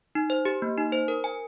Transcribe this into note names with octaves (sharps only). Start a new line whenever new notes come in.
D#4
C5
G4
A#3
D#4
C5
A#4
G#5